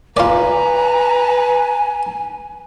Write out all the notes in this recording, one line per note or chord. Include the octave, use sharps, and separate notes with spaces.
F4 B4 D5 G#5 A#5